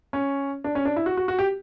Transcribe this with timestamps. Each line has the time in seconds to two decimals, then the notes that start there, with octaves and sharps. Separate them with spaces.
0.13 C#4
0.64 D4
0.75 C#4
0.85 D4
0.96 E4
1.06 F#4
1.17 F#4
1.28 F#4
1.39 G4